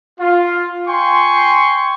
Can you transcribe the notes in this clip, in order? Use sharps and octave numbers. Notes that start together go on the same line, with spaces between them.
F4
G5 G#5 C6 C#6